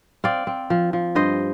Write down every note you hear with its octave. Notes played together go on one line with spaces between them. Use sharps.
C4 D5 F5
C4
F3
F3
G2 C5 D#5